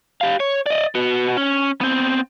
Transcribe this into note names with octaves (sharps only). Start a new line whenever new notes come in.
G4 F5
C#5
D5 D#5
B3 F#4
C#4
B3 C4